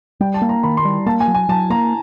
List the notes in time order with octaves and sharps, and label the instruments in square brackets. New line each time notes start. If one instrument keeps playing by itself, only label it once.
[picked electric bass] G3 [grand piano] G5
[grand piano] A5
[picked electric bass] A#3
[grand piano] A#5
[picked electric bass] D#3 [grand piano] B5
[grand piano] C6
[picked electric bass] G3
[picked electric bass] A#3 [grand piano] A5
[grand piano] G#5
[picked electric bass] F#3
[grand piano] G#5
[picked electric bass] F#3 [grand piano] A5
[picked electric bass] A#3 [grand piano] A#5